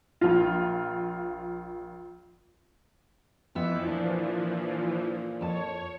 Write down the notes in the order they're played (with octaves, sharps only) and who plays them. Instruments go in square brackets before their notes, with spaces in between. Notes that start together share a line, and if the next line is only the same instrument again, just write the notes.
[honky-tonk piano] A#1 F4
[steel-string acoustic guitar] F2 B3 E5 [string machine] E3 F3
[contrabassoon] A#2 [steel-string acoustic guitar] D4
[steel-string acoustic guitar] F2 A5 [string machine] C#5